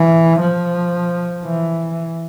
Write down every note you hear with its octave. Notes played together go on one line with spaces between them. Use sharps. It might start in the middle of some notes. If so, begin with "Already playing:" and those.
Already playing: E3
F3
E3